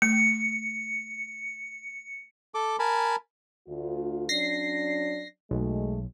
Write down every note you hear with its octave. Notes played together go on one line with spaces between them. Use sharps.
A3 C#7
A4 D6
A#4 G#5 A5 B5
D2 F4
F#3 C#4 D4 A#6 C7
B1 G#3 A3